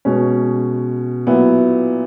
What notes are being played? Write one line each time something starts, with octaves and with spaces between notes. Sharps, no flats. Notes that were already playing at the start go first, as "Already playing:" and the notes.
B2 G#3 C#4
A#2 F#3 B3 E4